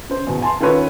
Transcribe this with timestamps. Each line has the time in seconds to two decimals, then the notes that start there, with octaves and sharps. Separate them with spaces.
0.10 C#4 C5
0.27 E2 B2
0.42 G#5 A5 C6
0.61 D#3 C#4 F4 A4 B4 C#5